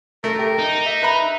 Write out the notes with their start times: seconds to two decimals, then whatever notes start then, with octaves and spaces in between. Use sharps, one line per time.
0.24 A3 A#4
0.39 G4
0.59 D#4
0.86 E5
1.02 B4 A#5 B5